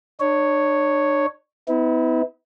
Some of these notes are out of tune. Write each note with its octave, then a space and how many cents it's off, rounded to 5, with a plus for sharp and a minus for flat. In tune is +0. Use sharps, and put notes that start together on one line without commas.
D4 +40 C#5 +0
B3 +30 E4 -35